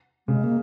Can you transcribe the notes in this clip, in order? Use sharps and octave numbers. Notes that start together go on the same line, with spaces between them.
C#3 G#3
A#3